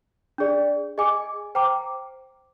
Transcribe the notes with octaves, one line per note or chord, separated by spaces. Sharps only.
D4 G#4 D5
G#4 D#5 G#5 D6
C5 G5 A#5 D6